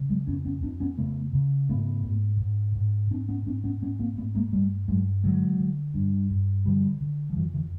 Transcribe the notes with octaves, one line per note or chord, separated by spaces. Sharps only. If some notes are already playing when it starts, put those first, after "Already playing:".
Already playing: C#3
F#3 G#3
F2 B3 C#4
B3 C#4
F2 C4 D4
B3 C#4
C#3 A3 B3
C#3
G#2 A3 B3
G#2
G#2
G#2
G#2 C4 D4
B3 C#4
G#2 C4 D4
B3 C#4
G#2 B3 C#4
A#3 C4
G#2 A3 B3
G#3 A#3
G2 G3 A3
G2 F#3 G#3
D3 F#3 G#3
D3
G2
G2
D3 F3 G3
D3
F3
F2 E3 F#3
D3 E3